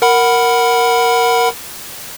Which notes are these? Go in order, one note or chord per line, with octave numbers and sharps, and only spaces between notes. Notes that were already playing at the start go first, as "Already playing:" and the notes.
A#4 F#5 B5